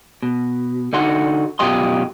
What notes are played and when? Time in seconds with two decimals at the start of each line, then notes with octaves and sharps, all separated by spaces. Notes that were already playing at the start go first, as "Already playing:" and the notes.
0.23 B2
0.93 D3 D#4 F#4 C6
1.59 F#2 B2 F4 G4 D#5 C6